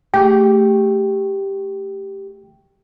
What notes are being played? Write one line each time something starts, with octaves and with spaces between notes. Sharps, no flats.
A3 G4 G#4 G5